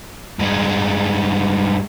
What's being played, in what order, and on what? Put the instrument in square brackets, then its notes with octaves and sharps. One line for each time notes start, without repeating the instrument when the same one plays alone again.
[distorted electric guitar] G2 G#3